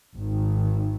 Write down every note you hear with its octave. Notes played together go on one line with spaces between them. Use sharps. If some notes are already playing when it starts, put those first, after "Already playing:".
G#1 D#3